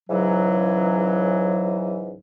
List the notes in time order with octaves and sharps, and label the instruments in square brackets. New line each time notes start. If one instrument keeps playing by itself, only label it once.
[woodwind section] C#2 G#2 C#3 E3 F#3